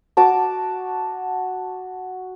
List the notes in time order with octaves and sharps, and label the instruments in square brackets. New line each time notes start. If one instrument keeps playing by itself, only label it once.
[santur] F#4 A5 D6